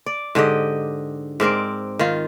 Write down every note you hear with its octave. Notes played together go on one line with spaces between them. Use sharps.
D5
G#2 D3 G4 D#5
G#2 C4 A#4 D5
D#3 F4